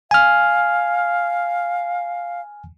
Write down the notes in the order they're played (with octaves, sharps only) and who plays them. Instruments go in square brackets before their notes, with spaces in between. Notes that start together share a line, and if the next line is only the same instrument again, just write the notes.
[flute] F5 [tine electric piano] G#5 F6